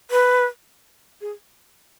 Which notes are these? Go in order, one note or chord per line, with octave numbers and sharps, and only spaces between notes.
B4
G#4